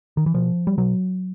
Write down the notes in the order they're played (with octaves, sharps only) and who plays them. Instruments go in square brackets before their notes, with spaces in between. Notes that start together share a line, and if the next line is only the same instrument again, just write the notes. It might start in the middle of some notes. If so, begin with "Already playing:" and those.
[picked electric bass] D#3
E3
B2 F3
G3
B2 F#3